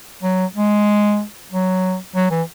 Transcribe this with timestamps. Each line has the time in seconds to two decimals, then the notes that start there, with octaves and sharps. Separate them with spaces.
0.23 F#3
0.55 G#3
1.52 F#3
2.16 F#3
2.31 E3